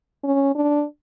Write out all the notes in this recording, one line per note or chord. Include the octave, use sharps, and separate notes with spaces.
C#4
D4